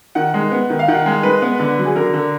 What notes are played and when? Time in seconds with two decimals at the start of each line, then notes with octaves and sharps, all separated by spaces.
0.15 D#3 F#5
0.34 G#3
0.52 B3
0.70 D#3
0.79 F5
0.88 D#3 F#5
1.06 G#3
1.23 G#3 B4
1.42 B3
1.60 D3
1.78 F#3
1.85 G#4
1.95 D3 A#4
2.13 D3